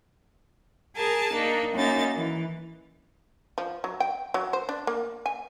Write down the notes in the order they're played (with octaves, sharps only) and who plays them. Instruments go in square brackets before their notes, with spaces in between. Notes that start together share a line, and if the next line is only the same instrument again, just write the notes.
[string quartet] G#4 A#4 G#5 A5
A#3 D4 D#4
F#2 A#3 D#4 A6
E3
[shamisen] F3
F#3
G5
F#3
C5
D4
A#3
G#5